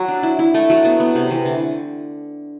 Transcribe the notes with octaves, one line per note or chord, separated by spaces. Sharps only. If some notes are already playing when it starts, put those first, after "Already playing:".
Already playing: F#3
D4
E4
E4
A3
F#3
B3
B3
C3
E3
D3